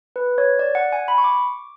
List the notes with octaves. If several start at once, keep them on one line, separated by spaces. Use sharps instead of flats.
B4
C#5
D5
F#5
G#5
B5
C#6
D6